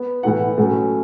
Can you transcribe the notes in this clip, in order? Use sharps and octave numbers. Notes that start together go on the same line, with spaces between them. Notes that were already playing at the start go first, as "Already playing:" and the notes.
Already playing: B3
A2 E3 B3 F#5
A2 F#3 A3 C#4